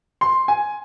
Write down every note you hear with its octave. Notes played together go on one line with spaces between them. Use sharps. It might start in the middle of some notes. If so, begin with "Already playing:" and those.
C6
G#5